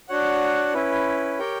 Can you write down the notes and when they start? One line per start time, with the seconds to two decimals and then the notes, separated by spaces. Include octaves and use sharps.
0.09 D4 F#4 C#5 F#5
0.74 C#4 E4 B4
1.39 G4 A#4 C#5 G5